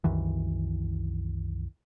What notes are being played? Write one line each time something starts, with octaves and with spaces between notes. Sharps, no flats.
C2 F#2 D#3 E3